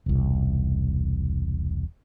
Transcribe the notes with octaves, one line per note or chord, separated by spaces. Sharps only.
E1 C2